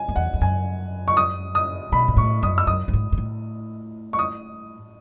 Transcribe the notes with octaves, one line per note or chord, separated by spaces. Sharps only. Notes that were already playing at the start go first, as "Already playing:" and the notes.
Already playing: G#5
F#2
E2 F#5
E2
F#2 G#5
C#6
D#6
D#6
B2 B5
G#2
A2 C#6
F#2 D#6
E6
F#2 D#6
F#2
G#2
G#2
A2
C#6
D#6